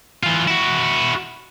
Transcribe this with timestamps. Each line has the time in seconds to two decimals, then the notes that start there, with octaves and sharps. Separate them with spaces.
0.23 E3 F4
0.48 E4 F#4